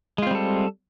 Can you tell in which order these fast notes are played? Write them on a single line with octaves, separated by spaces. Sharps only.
G#3 F4 C4 G3 A4